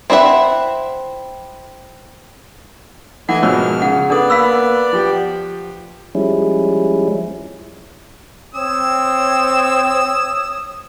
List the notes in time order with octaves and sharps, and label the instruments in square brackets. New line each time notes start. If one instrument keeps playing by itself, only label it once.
[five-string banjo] C4 E4 A4 E5 F#5
[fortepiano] E3 [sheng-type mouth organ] A3 D#5 G#5 [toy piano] F#5
[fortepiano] G#2 B2 F3 [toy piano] D4 A#4 C#5 [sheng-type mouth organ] F6
[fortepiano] C#3 [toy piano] F#5
[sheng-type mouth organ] B3 D5 [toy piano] D4 A4 D#6
[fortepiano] A#3 [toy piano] F5 B5 E6
[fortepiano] F3 G4 G5
[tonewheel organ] F3 G3 G#3 C#4 E4
[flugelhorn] C4 [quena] C#5 [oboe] D#6 [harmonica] E6